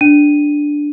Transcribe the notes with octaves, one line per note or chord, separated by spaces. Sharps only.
D4 D#7